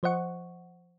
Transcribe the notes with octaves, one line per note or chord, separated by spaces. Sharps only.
F3 C5 D#5 F#5 C#6